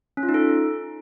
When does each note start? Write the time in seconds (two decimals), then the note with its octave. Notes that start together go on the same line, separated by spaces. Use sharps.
0.17 C#4
0.23 F4
0.29 D#4
0.34 A4